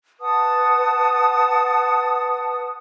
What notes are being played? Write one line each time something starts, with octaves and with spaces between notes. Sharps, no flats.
B4 F#5 A5 D#6